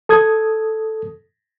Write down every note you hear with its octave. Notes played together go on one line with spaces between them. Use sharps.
A4 D#6 G#6